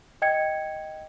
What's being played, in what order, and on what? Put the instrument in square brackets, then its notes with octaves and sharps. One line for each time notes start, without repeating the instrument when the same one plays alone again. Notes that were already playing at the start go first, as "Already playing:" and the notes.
[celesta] D#5 G5 G#6 C#7